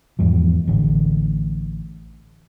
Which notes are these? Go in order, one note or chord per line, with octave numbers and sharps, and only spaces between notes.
E2 G#2 F3
A1 D3